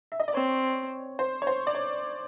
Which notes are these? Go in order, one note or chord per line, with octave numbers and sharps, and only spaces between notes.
E5
D#5
D5
C4 C#5
C5
C#5
C5
D5
C#5